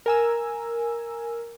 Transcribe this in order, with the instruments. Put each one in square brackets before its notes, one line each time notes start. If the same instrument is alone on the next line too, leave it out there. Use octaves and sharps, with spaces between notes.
[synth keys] A#4 G#5 E6